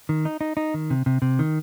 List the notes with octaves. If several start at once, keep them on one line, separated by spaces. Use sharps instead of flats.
D#3
D#4
D#4
D#4
D#3
C3
C3
C3
D#3